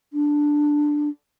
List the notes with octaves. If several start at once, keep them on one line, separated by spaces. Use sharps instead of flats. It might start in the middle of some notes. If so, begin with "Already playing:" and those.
D4